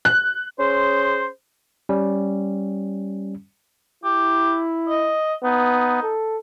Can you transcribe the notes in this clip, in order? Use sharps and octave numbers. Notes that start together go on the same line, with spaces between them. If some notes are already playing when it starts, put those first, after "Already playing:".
F#6
C#4 G#4 C5 C6
G3 C#4
E4 G4
D#5
B3 D#4
A4